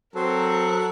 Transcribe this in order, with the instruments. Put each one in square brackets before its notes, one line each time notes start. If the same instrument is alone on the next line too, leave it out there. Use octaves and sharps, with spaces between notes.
[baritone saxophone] F#3 [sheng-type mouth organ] C4 C5 [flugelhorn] A4 [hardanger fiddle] A#4